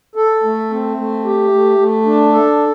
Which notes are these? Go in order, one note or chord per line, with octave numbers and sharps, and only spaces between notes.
A4
A3
C4
A3
G4
A3
A3
D4
A4